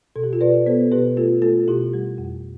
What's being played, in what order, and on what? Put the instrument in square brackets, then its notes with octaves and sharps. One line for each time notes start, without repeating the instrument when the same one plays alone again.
[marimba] B2 A4
G4
F4 A4
B2 B4 D5
B3 A4 C5
A4
B2 G4 B4
A3 F4 A4
A3 F4 A4
B2 E4 G4
G3
F2